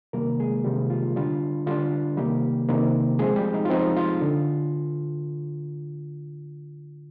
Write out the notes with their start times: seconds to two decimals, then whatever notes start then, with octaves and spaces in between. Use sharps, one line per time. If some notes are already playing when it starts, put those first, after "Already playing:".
0.13 C3 D#3 G3 A#3 A#4
0.40 G#3 G#4
0.64 C3 D#3 G3 G4
0.90 F4
1.16 D3 G3 D4 F4
1.67 D3 G3 D4 F4
2.17 C3 D#3 G3 A#3 G4
2.69 C3 D#3 A#3
3.19 F3 G#3 C4 G#4
3.36 G3 G4
3.54 D#4
3.65 F4
3.70 F3 C4 D#4
3.97 F4
4.22 D3